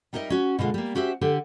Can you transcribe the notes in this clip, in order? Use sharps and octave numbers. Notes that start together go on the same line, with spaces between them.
G3 D#4 A#4 C5 D#5 E5
C#4 F#4
B2 D3 G#3 F4
G3 A#3
C#4 F#4 G4 C5 E5
D3 G4 A4